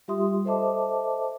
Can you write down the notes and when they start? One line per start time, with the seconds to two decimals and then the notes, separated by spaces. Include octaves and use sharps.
0.08 G3 F4 G4 E5 C6 D#6
0.45 A4 C5 D#5 E5 A5 D6